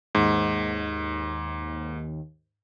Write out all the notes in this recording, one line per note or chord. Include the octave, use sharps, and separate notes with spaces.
D#2 G#2